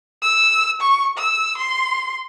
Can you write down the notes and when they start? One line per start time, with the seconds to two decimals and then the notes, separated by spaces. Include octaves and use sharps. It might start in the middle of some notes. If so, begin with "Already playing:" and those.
0.22 E6
0.81 C#6
1.17 E6
1.57 C6